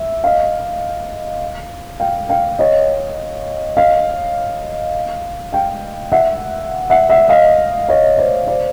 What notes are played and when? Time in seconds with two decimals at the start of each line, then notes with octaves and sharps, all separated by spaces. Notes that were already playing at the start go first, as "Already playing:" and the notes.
Already playing: E5
0.24 D#5 F5
2.00 F5 G5
2.29 F5 G5
2.59 C#5 D#5
3.77 D#5 F5
5.53 F5 G5
6.12 E5 F#5
6.90 E5 F#5
7.10 E5 F#5
7.29 D#5 F5
7.89 C#5 D#5
8.18 C5 D5
8.47 C5 D5